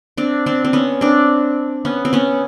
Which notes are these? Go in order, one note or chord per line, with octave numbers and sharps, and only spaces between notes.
C4 D4
C4 D4
C4
B3 C#4
C4 D4
B3 C#4
C4
B3 C#4